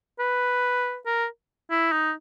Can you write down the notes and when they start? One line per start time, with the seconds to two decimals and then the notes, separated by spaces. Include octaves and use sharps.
0.19 B4
1.06 A#4
1.71 E4
1.92 D#4